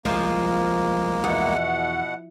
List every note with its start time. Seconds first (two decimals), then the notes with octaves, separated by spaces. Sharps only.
0.05 C2 F3 G#3 A#3
1.24 E2 B2 F#5